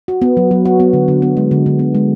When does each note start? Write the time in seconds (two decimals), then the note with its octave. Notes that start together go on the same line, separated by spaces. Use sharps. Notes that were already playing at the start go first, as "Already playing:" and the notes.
0.08 F#4
0.22 B3
0.37 F#3
0.51 F#3
0.65 F#4
0.80 B3
0.93 D3
1.08 D3
1.22 B3
1.37 G#3
1.51 D3
1.66 D3
1.79 B3
1.95 G#3